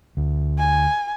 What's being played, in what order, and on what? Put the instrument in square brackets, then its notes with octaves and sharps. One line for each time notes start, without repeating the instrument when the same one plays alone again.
[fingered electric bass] D2
[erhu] G#5